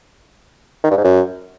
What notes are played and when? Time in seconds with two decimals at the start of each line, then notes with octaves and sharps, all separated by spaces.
0.84 D#3
0.91 G2
0.97 G#2
1.04 F#2